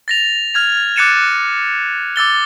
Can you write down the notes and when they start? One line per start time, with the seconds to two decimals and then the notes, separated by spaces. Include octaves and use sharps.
0.08 A6 A#6 F7
0.54 F6 G#6 F7
0.96 D6 F#6 A6 C#7 D#7 E7
2.16 D6 E6 A6 G7